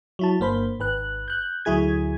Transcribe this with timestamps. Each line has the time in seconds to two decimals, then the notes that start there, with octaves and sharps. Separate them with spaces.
0.19 F#3 E4 A5
0.40 G1 A#3 C5 B5
0.80 G#1 B4 F#6
1.28 F#6 G6
1.65 D2 F#3 E4 G#4 G#6